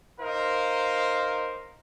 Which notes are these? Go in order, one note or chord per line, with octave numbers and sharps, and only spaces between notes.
D#4 A#4 C5 F5